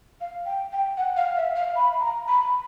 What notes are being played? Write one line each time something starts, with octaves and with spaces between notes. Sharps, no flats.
F5
G5
G5
F#5
F5
E5
F5
B5
A#5
B5